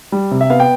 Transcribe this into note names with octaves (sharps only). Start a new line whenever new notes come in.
G3
C3
E5
B3 F5
G5